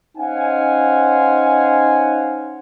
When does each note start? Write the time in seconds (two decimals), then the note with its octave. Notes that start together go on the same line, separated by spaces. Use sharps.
0.17 C#4 D#4 C5 F5 F#5 G#5